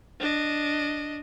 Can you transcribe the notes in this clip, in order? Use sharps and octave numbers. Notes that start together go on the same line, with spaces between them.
D4 D#5